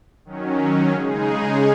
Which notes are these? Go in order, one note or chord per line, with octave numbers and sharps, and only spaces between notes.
D#3 F#3 C#4
C#3 G#3 D#4 G#4